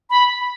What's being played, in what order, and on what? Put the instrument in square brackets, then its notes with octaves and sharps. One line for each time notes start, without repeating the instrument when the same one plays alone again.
[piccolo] B5